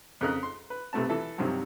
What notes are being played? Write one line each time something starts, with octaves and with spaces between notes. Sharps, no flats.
F2 C#3 A#4 D#5 F#6
C6
B4
B1 C3 A3 B3 A5
E3 A4 E5
G2 C3 D#3 F3 F#3